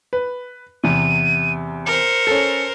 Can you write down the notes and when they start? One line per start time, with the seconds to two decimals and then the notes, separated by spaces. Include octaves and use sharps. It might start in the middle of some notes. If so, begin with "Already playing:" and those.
0.13 B4
0.84 E2 C3 D#7
1.86 A#4 C5 C#7
2.27 C#4 A4